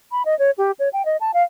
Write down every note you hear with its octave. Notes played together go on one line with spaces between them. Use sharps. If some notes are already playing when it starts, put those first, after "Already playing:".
B5
D#5
C#5
G4
C#5
G5
D#5
A5
F5